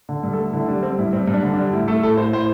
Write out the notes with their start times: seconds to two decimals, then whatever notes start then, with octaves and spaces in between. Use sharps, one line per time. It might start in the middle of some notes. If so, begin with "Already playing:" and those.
0.09 D3
0.23 G2
0.33 A4
0.38 A3
0.53 D3 E4
0.68 G3 D4
0.83 G3 C4
0.99 G2 E4
1.13 G2 C4
1.28 G2
1.34 D4
1.43 D3
1.53 D4
1.58 G3
1.72 A2 E4
1.88 A3 A4
2.03 A2 A4
2.17 A2 C5
2.33 A2 C5